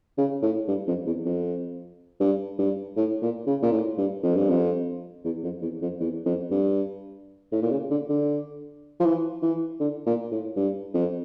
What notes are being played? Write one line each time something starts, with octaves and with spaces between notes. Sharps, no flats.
C#3
A2
G2
F2
E2
F2
G2
G2
A2
A#2
C#3
A#2
A2
G2
F2
G2
F2
E2
F2
E2
F2
E2
F2
G2
A2
A#2
C#3
D3
D3
F3
E3
E3
D3
A#2
A2
G2
F2